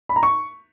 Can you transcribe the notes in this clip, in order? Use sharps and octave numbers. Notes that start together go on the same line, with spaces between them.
B5
A#5
C#6